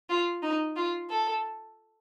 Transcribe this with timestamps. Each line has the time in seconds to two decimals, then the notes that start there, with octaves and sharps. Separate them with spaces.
0.09 F4
0.43 D#4
0.76 F4
1.10 A4